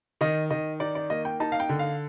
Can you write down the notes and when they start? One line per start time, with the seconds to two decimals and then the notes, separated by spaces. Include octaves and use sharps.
0.21 D#3 D#5
0.50 D#3 D#5
0.80 D#4 D5
0.95 D5
1.10 A#3 D#5
1.25 G5
1.40 D#4 A5
1.52 F5
1.60 G5
1.69 D3
1.79 F5